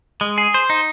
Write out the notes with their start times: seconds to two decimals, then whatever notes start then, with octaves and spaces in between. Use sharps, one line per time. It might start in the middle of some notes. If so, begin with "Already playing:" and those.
0.21 G#3
0.38 G#4
0.54 C5
0.70 D#4